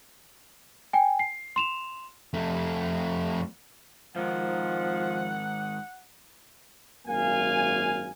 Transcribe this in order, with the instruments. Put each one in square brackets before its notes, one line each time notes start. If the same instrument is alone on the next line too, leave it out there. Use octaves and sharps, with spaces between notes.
[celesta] G5 G#5
C7
C6 E7 F7
[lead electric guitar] F2 A3
[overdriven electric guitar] G#2 D#3 [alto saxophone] F3 [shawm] F#5
[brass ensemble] G#1 F#2 A#3 F5 G#5